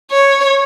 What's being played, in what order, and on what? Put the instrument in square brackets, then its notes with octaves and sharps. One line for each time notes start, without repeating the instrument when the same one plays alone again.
[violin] C#5